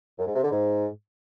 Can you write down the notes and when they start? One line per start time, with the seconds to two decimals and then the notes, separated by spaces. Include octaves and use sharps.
0.19 F#2
0.27 G#2
0.35 C3
0.44 D3
0.52 G#2